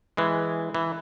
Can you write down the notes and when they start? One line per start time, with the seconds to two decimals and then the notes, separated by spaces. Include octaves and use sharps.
0.17 E3 G#3
0.75 E3